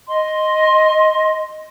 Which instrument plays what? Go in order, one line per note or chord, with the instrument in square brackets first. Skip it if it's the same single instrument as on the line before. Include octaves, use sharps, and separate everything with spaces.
[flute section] D#5 C6